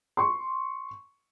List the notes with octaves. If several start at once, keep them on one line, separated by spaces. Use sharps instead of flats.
C6 C#6